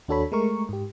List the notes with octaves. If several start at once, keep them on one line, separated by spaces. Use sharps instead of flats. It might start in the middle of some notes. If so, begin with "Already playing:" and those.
D#2 D4 F#4 A4 C#5 B5
G#3 A3 A#4 C#6
G#2 G4